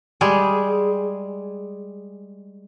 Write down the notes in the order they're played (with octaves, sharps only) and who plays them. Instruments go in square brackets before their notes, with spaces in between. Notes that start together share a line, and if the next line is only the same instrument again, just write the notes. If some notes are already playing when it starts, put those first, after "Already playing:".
[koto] G3 G#3 G#4